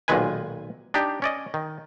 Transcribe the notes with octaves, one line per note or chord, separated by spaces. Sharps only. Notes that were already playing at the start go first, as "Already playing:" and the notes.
B1 A#2 D#3 G#3 B4 G#5
D4 D#4 G4
C#4 D5 D#5
D#3